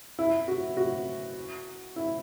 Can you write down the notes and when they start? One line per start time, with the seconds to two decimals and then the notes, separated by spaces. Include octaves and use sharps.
0.19 E4
0.48 F#4
0.77 F#4
1.96 E4